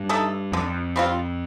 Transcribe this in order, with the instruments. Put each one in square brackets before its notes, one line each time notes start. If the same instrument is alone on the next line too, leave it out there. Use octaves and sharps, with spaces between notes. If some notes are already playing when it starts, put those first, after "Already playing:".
Already playing: [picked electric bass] G2
[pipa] A3 D#4 A4
[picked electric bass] F2 [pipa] D3
[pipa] G3 C4 F4